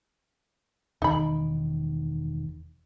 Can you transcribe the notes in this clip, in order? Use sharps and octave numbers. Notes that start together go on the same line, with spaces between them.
E1 D#3 D#4 B5